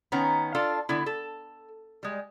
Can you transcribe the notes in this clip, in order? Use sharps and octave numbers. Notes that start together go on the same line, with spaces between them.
D#3 B3 C#4 D#4 A#5
D4 F4 A4 F5
D3 B3 E4
A4
G3 G#3